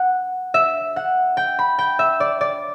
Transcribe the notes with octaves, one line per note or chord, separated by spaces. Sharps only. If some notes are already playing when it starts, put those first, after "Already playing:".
Already playing: F#5
E5
F#5
G5
B5
G5
E5
D5
D5